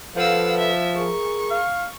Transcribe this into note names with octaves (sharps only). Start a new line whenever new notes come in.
F3 A4 B4 F5 F#5 E6
E5
G#4 A#4 C#6
F5